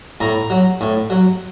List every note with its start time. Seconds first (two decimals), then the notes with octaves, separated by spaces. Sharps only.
0.20 A2 A#5
0.50 F#3
0.81 A2
1.10 F#3